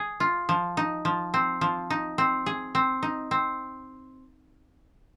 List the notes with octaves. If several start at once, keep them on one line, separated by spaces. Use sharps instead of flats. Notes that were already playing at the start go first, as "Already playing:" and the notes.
Already playing: G#4
F4
F3
D#4
F3
C4
F3
D#4
C4
G#4
C4
D#4
C4